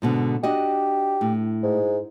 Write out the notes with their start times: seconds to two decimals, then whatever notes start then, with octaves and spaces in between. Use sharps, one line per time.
0.02 G#2 B2 D3
0.43 D4 F#4 G4 D#5
1.21 A2
1.63 G#2